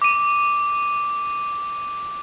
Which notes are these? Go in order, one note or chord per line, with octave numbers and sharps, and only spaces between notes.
D6 D#7